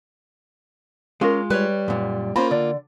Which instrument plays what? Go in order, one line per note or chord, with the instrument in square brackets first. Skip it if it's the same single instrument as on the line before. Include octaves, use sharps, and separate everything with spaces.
[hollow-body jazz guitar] G#3 F4 [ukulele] C#4 A#4
[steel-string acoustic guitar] G3 [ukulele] B4 C#5
[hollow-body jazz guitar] F#2 A#2
[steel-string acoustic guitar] A#3 F4 [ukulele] C#4 B5 [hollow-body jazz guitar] A#4 C5
[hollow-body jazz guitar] D3 [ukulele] D5